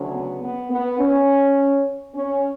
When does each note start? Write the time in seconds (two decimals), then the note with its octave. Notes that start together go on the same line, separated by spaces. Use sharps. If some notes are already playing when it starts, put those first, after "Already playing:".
Already playing: D2 C#3 F#3
0.13 B3
0.42 B3
0.70 B3
0.99 C#4
2.15 C#4